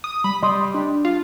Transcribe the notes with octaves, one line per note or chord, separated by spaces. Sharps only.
D#6
G3 B5
G3 D#5 C6 D#6
D4
F4